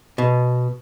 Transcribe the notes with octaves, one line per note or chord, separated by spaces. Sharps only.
B2